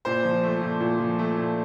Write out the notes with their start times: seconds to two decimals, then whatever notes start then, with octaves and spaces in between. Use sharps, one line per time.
0.05 A#2 C5
0.25 F3
0.43 A3
0.61 A#2
0.80 A#2
0.99 F3
1.19 A3
1.37 A#2